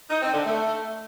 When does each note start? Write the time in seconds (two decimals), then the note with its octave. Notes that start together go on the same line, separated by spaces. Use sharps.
0.10 D#4
0.22 C4
0.34 D3
0.46 A3